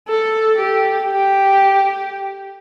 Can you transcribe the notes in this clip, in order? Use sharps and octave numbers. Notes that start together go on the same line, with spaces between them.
A4
G4
G4